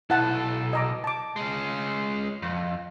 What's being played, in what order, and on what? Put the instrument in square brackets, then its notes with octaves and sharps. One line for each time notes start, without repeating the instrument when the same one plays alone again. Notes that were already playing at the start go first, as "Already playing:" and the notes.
[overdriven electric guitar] B1 A4 [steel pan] E4 F#5 A5
[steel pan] D#5 A#5 D6
A5 D6
[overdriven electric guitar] G#3 C#4
F2